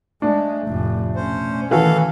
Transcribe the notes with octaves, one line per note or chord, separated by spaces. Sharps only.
G#3 A3 D4
F1 A2
B2 C#4 C5
D#3 E3 F#4 A4 F5